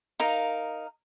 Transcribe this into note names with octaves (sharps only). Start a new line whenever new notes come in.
D#4 A#4 F5